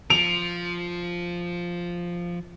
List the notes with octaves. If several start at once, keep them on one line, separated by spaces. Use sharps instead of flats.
F3 D7 F7